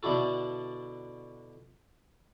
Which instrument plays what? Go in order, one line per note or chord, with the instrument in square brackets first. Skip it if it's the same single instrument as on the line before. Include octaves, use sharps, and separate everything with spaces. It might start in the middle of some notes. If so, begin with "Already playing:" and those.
[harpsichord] B2 D3 D4 E4 F#4 A4